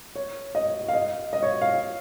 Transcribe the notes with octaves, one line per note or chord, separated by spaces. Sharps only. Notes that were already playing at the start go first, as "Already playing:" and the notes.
C#5
D#5
F5
D#5
D#5
C#5
F5